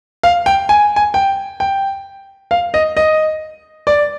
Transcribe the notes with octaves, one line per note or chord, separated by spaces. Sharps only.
F5
G5
G#5
G#5
G5
G5
F5
D#5
D#5
D5